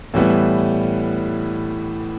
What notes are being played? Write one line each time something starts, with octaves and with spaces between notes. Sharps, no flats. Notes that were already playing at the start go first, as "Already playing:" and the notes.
A2 E3 G3 B3